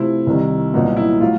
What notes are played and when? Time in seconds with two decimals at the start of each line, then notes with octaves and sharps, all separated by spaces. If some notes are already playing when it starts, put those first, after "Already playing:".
Already playing: C3 F3 A3 C4 E4
0.27 C2 C3 D#3
0.73 C2 A#2 F#3 B3 D#4
0.97 E4
1.20 A2 F#3 F4